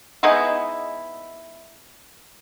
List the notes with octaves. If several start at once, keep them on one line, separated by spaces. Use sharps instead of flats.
G#3 B3 D#4 E4